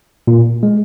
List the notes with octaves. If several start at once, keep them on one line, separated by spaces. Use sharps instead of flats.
A#2
G#3